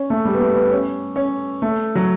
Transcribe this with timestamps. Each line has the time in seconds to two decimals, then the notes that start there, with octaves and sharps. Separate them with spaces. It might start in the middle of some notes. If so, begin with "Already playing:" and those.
Already playing: C#4
0.10 A3
0.25 G3
0.35 B3
0.41 A3
0.56 B3
0.71 C#4
1.16 C#4
1.62 A3
1.95 F#3